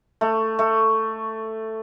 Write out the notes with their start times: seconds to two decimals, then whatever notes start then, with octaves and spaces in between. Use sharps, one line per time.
0.21 A3
0.59 A3